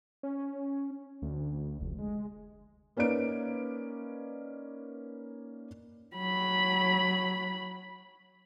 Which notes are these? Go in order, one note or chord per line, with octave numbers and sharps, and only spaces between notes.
C#4
D2
F1
G#3
A#3 C#4 D#4 B4 D5 D7
F#3 B5